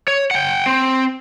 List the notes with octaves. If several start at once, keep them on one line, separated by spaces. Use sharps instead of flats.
C#5
F#5 G5
C4